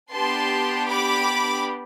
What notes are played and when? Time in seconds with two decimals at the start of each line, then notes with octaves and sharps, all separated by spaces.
0.12 B3 D4 G4 A5 C6
0.89 B5 D6